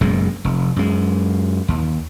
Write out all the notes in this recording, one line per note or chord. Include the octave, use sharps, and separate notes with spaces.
F#1 F#2 B2 G#3
F1
F#2 G#3
D#2